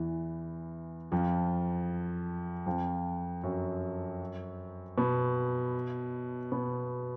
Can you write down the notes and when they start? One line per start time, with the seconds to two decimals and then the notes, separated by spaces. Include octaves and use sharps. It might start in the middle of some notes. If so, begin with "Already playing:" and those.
Already playing: E2 E3
1.12 F2 F3
2.66 F2 F3
3.43 F#2 F#3
4.98 B2 B3
6.52 B2 B3